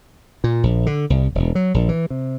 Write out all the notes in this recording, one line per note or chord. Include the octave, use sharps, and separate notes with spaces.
A#2
A#1
D3
C2
E1
F#3
A#1
E3
C3